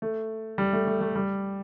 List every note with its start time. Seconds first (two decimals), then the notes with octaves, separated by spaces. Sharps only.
0.02 A3
0.58 G3
0.73 A3
0.87 A3
1.01 A3
1.16 G3